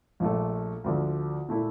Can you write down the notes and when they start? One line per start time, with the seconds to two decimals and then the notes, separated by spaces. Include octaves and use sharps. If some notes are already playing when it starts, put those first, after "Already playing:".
0.20 A#1 A#2 A3
0.84 D2 D3 F3
1.49 A#2 A3 E4